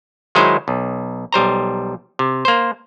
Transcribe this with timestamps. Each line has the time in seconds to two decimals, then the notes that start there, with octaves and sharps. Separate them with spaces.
0.35 D#3 F#3 G#3 D#4 E4 C5
0.68 B1
1.33 B1 G3 C5 A#5
2.19 C3
2.45 A#3 C5